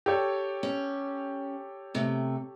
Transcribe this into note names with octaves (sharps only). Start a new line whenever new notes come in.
G4 A4 C#5
C#4
C3 A3